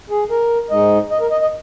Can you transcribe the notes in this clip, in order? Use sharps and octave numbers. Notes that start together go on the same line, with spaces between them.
G#4
A#4
G#2 G#3 D#4 D#5
D#5
A#4
D#5
D#5